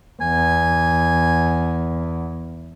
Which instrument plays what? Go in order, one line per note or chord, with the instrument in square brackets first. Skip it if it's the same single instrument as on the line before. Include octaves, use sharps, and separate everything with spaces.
[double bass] E2 [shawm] G#5